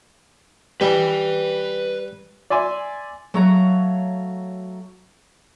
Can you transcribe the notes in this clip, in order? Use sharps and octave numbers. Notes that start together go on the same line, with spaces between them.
G3 B4 G#5
D5 E5 G#5 C6
F#3 A3 F#4 C#5 F5 A#5